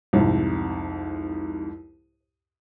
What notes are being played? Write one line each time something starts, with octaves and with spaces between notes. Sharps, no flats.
C2 F2 G#2